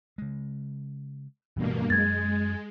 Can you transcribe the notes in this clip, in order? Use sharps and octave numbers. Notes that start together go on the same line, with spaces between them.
C#3 G#3
D1 G2 B2 E3 A3 A#3
F#2 F#3 G#3 G#6 A6